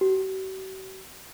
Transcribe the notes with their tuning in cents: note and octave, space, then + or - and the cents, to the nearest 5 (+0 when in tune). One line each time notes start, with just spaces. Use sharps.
F#4 +45